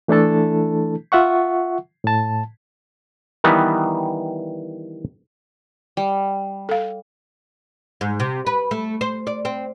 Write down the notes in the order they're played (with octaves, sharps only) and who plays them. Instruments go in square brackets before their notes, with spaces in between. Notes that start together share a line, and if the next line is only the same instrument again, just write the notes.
[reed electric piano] E3 A3 D4 E4 A4 A5
F4 E5 F#5 C#6
A2 A5
[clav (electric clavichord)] D#3 E3 G3 B3
[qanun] G3
[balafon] A4 F5
[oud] G#2
C3
B4
A3
C5
D5
C4